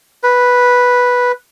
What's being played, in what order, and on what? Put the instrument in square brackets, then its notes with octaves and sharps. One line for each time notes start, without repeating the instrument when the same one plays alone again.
[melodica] B4